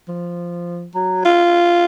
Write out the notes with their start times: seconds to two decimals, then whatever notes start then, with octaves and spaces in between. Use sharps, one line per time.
0.08 F3
0.94 F#3
1.25 F4